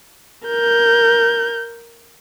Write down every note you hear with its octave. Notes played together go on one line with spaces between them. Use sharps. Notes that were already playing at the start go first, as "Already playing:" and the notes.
A#4 G6